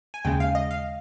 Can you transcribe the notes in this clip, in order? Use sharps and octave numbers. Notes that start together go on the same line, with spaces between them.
G#5
D#2 C#3 G#3 G5
F5
D#5
F5